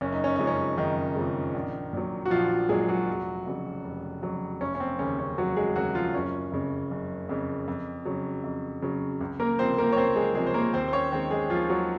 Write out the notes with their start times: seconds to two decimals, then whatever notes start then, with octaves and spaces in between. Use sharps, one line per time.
0.01 F#1 C#4
0.12 D#4
0.24 C#4
0.36 F2 C#3 F3 G#3 D#4
0.47 C#4
0.78 F#1 D#3 D#4
1.16 F2 C#3 F3 G#3
1.54 A#1
1.93 A#2 F#3
2.25 F#4
2.30 A#1 F3 F4
2.69 A#2 F#3 G#3 G#4
2.88 F#3 F#4
3.07 F1
3.46 F2 C#3 F#3
3.84 F1
4.22 F2 C#3 F#3
4.61 F1 C#4
4.75 C#4
4.80 C4
4.99 D#2 C#3 C#4
5.19 C#4
5.38 F1 F#3 F#4
5.56 G#3 G#4
5.76 D#2 C#3 F#3 F#4
5.94 F3 F4
6.13 F#1 C#4
6.52 F2 C#3
6.91 F#1
7.29 F2 C#3
7.68 F2
8.05 C#3 F#3
8.44 F2
8.82 C#3 F#3
9.21 C#2
9.40 A#3 A#4
9.59 C3 F3 C4 C5
9.78 A#3 A#4
9.92 C#5
9.97 C#2 C4 C5
10.16 G#3 G#4
10.35 C3 F3 G#3 G#4
10.46 C5
10.54 A#3 A#4
10.74 D#2 C4 C5
10.88 C5
10.92 C#4 C#5
11.12 D#3 G#3 C4 C5
11.31 G#3 G#4
11.50 D#2 F3 F4
11.70 F#3 F#4